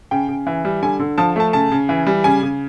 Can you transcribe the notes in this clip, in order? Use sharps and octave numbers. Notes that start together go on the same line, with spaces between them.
C#3 G5
C#3
E3
G3
D3 G#5
D3
F3 A5
A3 A5
C#3 A5
C#3
E3
G3
C#3 G#5
C#3